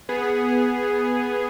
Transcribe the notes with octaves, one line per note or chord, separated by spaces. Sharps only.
B3 G#4